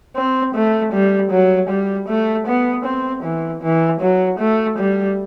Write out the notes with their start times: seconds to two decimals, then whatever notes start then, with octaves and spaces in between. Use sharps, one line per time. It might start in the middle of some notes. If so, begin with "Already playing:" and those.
0.16 C4
0.55 A3
0.93 G3
1.31 F#3
1.70 G3
2.09 A3
2.47 B3
2.85 C4
3.23 E3
3.62 E3
4.01 F#3
4.39 A3
4.78 G3